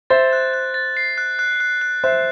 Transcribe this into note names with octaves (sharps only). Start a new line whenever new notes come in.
C5 E5 A6
F#6
F#6
A6
C7
F#6
F#6
F#6
F#6
C5 E5 F#6